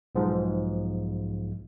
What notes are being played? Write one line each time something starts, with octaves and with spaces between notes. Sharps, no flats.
B1 G#2 F3